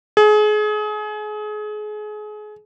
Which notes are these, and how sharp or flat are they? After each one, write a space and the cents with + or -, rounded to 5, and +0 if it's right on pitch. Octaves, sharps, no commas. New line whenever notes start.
G#4 +30